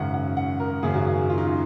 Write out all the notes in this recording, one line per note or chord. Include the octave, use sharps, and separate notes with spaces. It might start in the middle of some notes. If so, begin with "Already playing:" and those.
Already playing: G#1 F#2 C#3 F#5
F#5
F#5
A#4
G#1 F#2 C#3 G#4
F#4
G#4
F4
D#4
F4